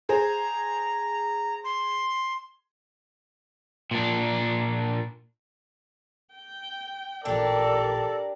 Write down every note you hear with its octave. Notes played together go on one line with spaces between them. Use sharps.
G#4 C5 A#5
C6
A#2 D4
G5
A1 A#2 D4 G4 A4 A#4 D5 G5